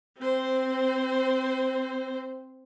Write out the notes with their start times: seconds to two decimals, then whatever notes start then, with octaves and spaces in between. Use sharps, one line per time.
0.18 C4 C5